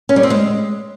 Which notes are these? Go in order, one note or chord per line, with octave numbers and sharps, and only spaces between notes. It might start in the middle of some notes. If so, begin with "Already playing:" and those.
C#4
G3
C4
G#3